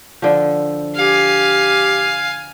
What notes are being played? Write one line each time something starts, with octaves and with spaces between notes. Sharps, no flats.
D3 F3
G4 F5 G#5